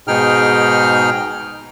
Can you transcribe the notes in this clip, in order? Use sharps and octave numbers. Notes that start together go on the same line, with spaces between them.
G#2 B2 D#4 G#4 G5 F6